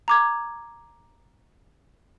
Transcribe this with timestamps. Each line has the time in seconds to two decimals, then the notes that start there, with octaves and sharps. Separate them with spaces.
0.08 A#5 D6 G#6